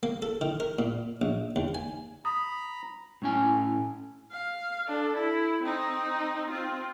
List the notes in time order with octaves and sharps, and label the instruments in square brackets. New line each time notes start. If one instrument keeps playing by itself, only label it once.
[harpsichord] A#3
A4
D#3
A#4
A#2
A#1
D#2
G#5
[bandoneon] A#5 B5 [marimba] D#6
[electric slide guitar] A2 C#4 G#5
[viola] F5
D4 A4
E4
C4 D#4
C4 F4